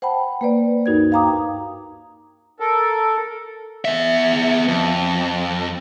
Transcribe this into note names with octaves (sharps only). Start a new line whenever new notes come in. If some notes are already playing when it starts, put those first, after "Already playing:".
C5 F#5 G5 A5 B5
A#3 B4 C5 D5
D2 G2 D#4 F#4 A#4 G#6
F5 G5 A#5 D6 D#6
A4 A#4
B3 E5
F2